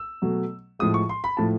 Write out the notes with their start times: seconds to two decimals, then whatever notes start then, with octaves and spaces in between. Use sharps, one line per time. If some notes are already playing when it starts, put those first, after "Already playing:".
Already playing: E6
0.22 B2 F#3 A3
0.79 A2 F3 G#3 D#6
0.94 C#6
1.09 C6
1.24 B5
1.37 A2 F3 A3 A5